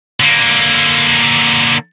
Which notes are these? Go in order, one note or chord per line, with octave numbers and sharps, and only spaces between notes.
D3 A#3